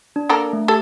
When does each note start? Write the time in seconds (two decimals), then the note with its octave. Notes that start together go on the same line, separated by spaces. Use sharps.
0.16 D4
0.29 A#3 A4 A#4
0.53 A3
0.68 G4 A4